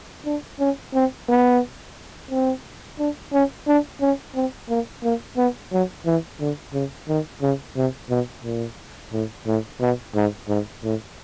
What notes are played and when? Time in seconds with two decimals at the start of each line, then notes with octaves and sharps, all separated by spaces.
0.26 D4
0.60 C#4
0.94 C4
1.29 B3
2.31 C4
2.99 D4
3.33 C#4
3.68 D4
4.01 C#4
4.35 C4
4.69 A#3
5.03 A#3
5.37 B3
5.72 F#3
6.06 E3
6.40 D3
6.74 C#3
7.08 D#3
7.42 C#3
7.76 C3
8.10 B2
8.44 A#2
9.13 A2
9.47 A2
9.81 B2
10.15 G#2
10.49 G#2
10.84 A2